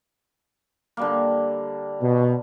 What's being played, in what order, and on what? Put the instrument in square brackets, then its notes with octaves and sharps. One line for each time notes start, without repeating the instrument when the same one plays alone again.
[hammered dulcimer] D3 G3 A#3
[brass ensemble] B2